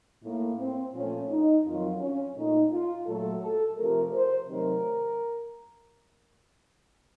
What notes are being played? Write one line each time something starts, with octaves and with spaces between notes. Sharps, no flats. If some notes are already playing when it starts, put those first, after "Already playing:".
A2 A3 A#3
C4
A#2 F3 A3 C#4
D#4
F2 D#3 F#3 F4
C#4
A#2 A3 D#4
F4
A#2 F#3 A3 A4
A4
C3 F3 A3 A#4
C5
C3 D#3 F#3 A3 A#4